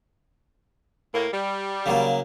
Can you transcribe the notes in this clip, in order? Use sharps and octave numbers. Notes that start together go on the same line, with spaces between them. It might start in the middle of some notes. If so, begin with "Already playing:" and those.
A2 A#3
G3
C#3 F#3 A#3